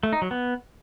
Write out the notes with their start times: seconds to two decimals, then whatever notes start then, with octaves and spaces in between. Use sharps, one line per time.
0.03 A3
0.13 D#4
0.22 F#3
0.31 B3